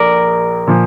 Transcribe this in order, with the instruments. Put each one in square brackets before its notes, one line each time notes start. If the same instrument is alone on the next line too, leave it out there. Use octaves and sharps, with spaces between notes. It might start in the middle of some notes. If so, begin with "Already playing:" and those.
Already playing: [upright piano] A#1 [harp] A#4 D5
[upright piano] A#2 F3